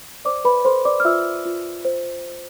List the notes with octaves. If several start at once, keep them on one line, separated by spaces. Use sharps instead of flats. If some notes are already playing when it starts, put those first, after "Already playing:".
C5 D5 D6
B4 B5
A4 C5 C6
D5 D6
F6
F4 E5 E6
F4
C5